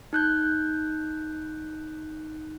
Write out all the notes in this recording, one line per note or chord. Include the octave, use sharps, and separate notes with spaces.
D#4 F#6 G6